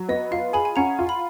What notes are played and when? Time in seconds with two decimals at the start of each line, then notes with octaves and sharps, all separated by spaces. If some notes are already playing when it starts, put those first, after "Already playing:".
Already playing: F#3
0.09 B3 D#5
0.31 F4 F5
0.53 G#4 G#5 B5
0.65 G#5
0.76 C#4 F#5 A#5
0.99 F4
1.09 B5